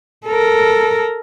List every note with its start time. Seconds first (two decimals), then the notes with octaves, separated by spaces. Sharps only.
0.26 A4 A#4